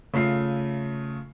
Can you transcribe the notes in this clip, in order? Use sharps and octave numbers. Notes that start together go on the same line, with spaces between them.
C#3 A3 F4 C7